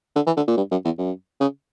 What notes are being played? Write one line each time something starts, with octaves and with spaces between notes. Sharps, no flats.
D3
E3
D3
A#2
G2
F#2
E2
F#2
C#3